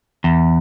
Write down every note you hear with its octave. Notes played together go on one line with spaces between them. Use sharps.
E2